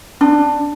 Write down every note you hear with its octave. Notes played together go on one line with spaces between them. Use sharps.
D4